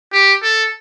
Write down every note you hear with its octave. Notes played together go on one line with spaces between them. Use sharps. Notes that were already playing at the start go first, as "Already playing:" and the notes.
G4
A4